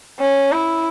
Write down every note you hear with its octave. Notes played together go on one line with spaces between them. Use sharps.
C#4
E4